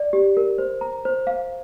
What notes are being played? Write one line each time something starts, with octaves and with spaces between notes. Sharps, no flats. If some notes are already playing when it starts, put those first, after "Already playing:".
Already playing: D5
G4
A#4
C5
A#5
C5
F5